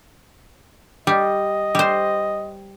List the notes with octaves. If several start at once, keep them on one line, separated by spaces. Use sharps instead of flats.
G3 D#5
G3 C5